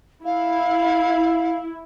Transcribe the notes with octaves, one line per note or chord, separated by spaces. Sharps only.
E4 F5